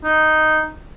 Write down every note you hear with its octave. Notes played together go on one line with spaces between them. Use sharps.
D#4